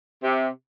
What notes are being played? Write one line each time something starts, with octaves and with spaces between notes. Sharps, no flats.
C3